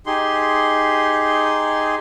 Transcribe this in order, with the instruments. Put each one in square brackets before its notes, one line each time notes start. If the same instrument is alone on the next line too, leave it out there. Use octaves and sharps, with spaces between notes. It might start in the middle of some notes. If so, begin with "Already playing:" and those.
[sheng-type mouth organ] D#4 G4 G#4 C6